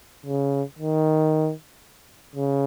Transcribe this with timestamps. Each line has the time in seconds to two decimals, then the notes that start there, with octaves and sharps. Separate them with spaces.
0.26 C#3
0.79 D#3
2.36 C#3